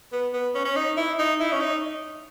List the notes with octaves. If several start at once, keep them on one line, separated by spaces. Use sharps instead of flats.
B3
B3
C#4
C#4
D#4
E4
D#4
E4
C#4
D#4